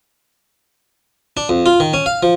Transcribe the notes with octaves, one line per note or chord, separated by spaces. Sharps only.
D4
F2
F4
D#3
C#4
F5
F3